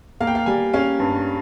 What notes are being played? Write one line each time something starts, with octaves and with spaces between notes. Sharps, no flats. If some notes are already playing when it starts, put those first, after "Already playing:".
A#3 F5
G5
F5
G3 G#5
C#4 F5
G2